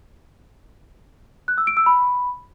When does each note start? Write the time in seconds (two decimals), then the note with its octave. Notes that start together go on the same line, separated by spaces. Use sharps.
1.48 F#6
1.58 E6
1.67 D7
1.77 E6
1.86 B5